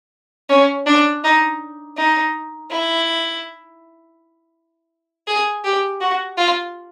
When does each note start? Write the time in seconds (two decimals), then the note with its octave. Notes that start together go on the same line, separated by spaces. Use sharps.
0.49 C#4
0.86 D4
1.24 D#4
1.97 D#4
2.70 E4
5.27 G#4
5.64 G4
6.01 F#4
6.37 F4